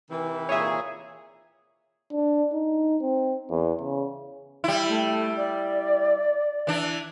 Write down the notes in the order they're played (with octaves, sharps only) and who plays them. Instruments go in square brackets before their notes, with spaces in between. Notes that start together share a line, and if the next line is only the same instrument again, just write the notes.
[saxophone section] C3 D#3 E3
[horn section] A#2 G#4 [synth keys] C#5 E5
[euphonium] D4
D#4
C4
E2
C#3
[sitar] G3 E4
[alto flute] A3
D5
[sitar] E3 D4